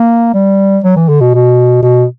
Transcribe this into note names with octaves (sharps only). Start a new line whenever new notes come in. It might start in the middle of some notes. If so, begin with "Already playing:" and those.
Already playing: A#3
G3
F#3
E3
D3
B2
B2
B2